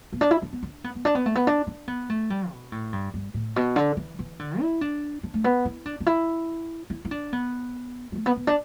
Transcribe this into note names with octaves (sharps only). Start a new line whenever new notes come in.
B3
D4
E4
D4
B3
D4
B3
B3
D4
B3
A3
B3
D4
D4
B3
A3
G3
B2
A2
G2
G2
A2
B2
D3
E3
E3
D3
E4
D4
D4
A3
B3
E4
D4
D4
E4
E4
E4
D4
B3
B3
A3
B3
B3
D4